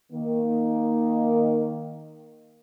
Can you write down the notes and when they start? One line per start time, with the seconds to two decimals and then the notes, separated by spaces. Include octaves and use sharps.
0.12 D#3 A#3